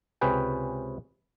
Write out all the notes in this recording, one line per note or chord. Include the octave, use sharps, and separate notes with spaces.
C#2 C3 C#4 G#4 B4 G5